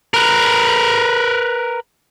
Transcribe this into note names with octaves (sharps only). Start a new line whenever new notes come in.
A#4 B4